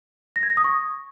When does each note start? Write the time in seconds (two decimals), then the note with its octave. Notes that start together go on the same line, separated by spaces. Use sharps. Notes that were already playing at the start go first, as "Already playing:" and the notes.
0.36 A#6
0.43 G#6
0.50 A#6
0.57 D#6
0.64 C#6